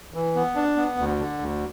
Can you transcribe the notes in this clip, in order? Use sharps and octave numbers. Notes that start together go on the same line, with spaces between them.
E3
B3
D4
B3
D2
D3
D2